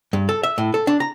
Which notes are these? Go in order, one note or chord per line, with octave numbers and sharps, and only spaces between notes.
G2
A4
E5
A2
A4
D4
A#5